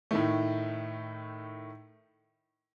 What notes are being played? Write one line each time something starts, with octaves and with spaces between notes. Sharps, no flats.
A2 D#3 A3